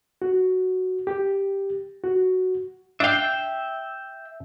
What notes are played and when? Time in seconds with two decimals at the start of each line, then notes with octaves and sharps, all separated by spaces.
0.22 F#4
1.07 G4
2.04 F#4
3.00 D4 E5 F5 G5